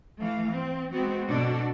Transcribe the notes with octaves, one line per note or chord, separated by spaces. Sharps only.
E3 A3 F5
C4
G#3 B3 C4 F#4
B2 D4 F#4 A4 D5